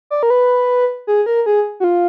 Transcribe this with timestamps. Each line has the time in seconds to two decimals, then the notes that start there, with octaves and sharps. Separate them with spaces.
0.10 D5
0.23 A#4
0.30 B4
1.07 G#4
1.26 A#4
1.46 G#4
1.80 F#4
1.84 F4